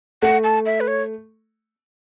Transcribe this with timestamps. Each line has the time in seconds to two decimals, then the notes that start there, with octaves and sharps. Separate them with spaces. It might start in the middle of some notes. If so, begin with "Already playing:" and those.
0.22 A3 F#5
0.44 A5
0.66 E5
0.80 B4
0.88 C#5